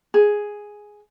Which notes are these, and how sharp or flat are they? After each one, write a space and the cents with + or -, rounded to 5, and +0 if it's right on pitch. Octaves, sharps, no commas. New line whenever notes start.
G#4 +0